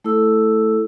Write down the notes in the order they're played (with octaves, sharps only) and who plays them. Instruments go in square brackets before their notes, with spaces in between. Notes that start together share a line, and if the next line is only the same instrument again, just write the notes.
[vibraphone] A3 E4 A4 E6